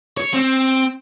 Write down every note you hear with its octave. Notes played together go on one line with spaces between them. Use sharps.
C#5
C4